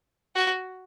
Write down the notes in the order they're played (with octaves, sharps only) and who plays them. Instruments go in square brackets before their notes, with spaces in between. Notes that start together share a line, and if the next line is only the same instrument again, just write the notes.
[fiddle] F#4